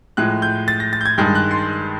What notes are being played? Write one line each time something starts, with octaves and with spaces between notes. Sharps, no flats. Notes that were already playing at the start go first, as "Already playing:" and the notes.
A2 F3 G#3 F#6
G6
A6
A#6
A6
G6
G#6
G2 D#3 G#3 G6
F#6
C6